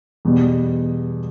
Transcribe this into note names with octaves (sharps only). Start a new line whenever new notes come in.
E2 B2 G3